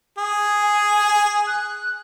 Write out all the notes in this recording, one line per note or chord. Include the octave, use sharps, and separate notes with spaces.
G#4
G#5
F#6